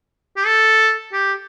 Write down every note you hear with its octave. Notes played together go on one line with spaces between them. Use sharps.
G4
A4
G4